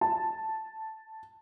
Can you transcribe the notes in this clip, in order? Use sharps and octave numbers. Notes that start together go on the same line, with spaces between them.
A5